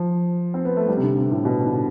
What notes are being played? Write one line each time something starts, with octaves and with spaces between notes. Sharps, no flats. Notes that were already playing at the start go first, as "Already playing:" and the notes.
Already playing: F3
C4
B3
A3
G3
C3
D3
C3
A2
B2
D3